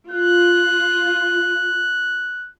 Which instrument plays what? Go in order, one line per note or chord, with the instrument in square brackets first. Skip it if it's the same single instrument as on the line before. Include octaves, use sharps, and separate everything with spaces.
[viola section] F4 [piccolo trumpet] F#6